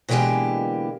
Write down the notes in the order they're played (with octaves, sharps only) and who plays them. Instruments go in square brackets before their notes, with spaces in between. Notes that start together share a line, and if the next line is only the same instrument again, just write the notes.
[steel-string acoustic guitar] B2 D3 E3 G#3 A#3 G4